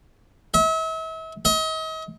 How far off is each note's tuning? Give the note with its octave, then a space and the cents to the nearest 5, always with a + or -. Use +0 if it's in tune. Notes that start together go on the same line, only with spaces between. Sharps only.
E5 -40
D#5 +40